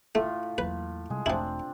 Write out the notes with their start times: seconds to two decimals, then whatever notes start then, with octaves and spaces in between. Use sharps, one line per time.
0.15 A2 A3 F4
0.58 E2 F#3 A#3 B4
1.10 C3 G3 G#3
1.26 E1 F3 A3 C4 D4 E4